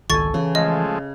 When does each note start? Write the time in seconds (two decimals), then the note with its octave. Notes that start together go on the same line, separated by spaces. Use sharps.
0.10 G#1 C#2 D#3 A4 G#5 C#6 A6
0.34 C#3 E3
0.55 F3 G#3 A3 D#5